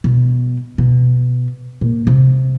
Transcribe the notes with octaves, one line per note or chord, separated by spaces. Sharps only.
B2
B2
A#2
C3